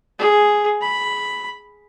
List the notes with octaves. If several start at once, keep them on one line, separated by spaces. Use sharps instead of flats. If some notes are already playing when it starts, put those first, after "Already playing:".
G#4
B5